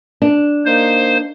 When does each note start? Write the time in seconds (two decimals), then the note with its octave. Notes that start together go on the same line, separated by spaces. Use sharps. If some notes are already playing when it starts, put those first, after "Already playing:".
0.22 D4
0.65 A#3 D#4 C5